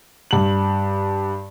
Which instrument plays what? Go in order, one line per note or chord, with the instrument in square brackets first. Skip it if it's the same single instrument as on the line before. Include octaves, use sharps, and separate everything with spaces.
[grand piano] G2 F#7